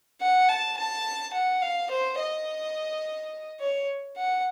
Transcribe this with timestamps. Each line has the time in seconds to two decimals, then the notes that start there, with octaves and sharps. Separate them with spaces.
0.21 F#5
0.48 A5
0.77 A5
1.33 F#5
1.62 F5
1.90 C5
2.19 D#5
3.60 C#5
4.17 F#5